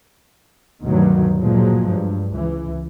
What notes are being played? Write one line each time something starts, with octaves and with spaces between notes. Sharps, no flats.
D2 G2 B2 D#3 F#3
A#2 F3 F#3 G#3
G2
C#2 E3